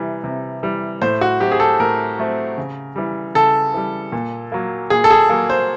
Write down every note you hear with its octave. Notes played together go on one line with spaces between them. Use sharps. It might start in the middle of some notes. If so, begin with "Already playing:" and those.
Already playing: C3 E3 G3
C3
E3 G3
A2 C5
F#4
F#3 A3 C4 G4
G#4
A4
A2 A#4
F#3 A3 C4
C#3
E3 G3
C#3 A4
E3 G3
A#2
F#3 A#3
A#2 G#4
A4
G#4
F#3 A#3 A4
C5